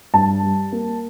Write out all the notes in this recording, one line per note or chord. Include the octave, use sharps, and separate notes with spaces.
G2 A5
G3
A#3